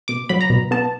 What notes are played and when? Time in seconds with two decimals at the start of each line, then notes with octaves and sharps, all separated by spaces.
0.08 B2 D6
0.29 F#3 B5
0.41 A#5
0.50 B2
0.71 B3 A5